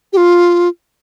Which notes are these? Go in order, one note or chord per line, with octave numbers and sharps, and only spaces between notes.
G4
F4